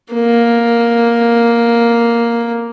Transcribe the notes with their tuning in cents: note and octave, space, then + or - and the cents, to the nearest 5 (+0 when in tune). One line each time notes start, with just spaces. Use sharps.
A#3 +5